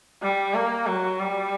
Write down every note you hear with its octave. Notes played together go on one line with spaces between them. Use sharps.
G3
A#3
F#3
G3